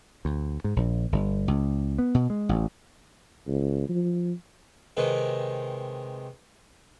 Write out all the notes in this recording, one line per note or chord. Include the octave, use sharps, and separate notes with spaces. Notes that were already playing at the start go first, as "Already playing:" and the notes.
D2
G#2
A#1
G1
C#2
B3
B2
G#3
A1
C#2
F3
C3 D#3 G#3 B4